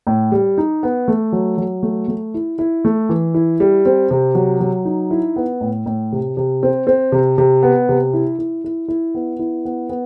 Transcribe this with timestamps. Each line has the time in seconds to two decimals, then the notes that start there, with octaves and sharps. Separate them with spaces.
0.07 A2
0.32 G3
0.58 D#4
0.83 B3
1.08 A3
1.32 F#3
1.58 F#3
1.83 A3
2.08 A3
2.34 E4
2.59 E4
2.85 A3
3.09 E3
3.34 E4
3.60 G3
3.86 C4
4.11 C3
4.35 F#3
4.60 F#3
4.85 D#4
5.11 E4
5.36 B3
5.61 A2
5.86 A2
6.12 C3
6.37 C3
6.63 C4
6.87 C4
7.12 C3
7.38 C3
7.63 B3
7.89 C3
8.13 E4
8.39 E4
8.64 E4
8.88 E4
9.14 B3
9.39 E4
9.65 B3
9.89 B3